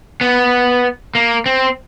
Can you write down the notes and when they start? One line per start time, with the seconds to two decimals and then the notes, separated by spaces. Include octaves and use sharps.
0.21 B3
1.15 A#3
1.46 C4